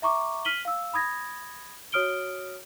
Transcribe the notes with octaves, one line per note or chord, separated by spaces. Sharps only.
E5 A#5 C#6 D6
F6 B6 D#7 F#7 G7
F5 E6
B5 D#6 G#6 A#6
F#4 C#5 D#6 F6 D7 G7